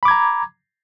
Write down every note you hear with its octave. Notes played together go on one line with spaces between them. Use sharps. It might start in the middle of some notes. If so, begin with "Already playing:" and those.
A#5 B5 D6 G#6